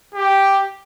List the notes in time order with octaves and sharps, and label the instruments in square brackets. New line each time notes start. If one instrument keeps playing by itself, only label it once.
[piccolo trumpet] G4